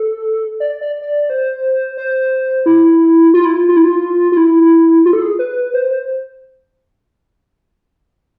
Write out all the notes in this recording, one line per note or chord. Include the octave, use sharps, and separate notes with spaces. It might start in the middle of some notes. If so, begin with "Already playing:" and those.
Already playing: A4
D5
D5
D5
C5
C5
E4
F4
E4
F4
F4
E4
F4
F4
E4
F4
A4
G#4
B4
C5
C5